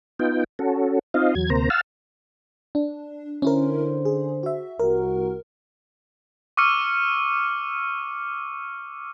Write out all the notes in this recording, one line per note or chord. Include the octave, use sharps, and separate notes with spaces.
B3 D#4 F4 G5
C#4 F#4 A4
C4 D#4 F4 D#5 F5
E2 F#3 G#6
D2 C3 A#3 C5 A#5
F5 F#5 A5 E6 F6
D4
D3 C#4 E4 A#4 C5
G#4
F#4 E5
C2 F#4 A#4
C#6 D6 E6 F6 C#7 D#7